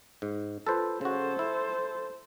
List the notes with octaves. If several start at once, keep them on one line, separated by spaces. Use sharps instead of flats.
G#2
F4 A4 B4 C5
C#3 F#4 A4 C5
E4